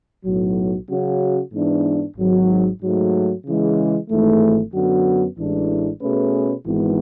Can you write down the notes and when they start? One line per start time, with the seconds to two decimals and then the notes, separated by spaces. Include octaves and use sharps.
0.24 B1 A2 F#3
0.89 C#3 F#3 C#4 F#4
1.53 G#2 E3 B3 D4
2.17 G#1 G#2 F#3
2.81 G#2 F#3 A3
3.45 C#3 E3 G#3
4.09 G#1 G#2 E3 A3
4.73 F#2 D3 F#3 B3 F#4
5.38 A1 A2 E3 G#3 D4
6.02 B2 A3 C#4 G#4 B4
6.65 G#1 G#2 E3 G#3 B3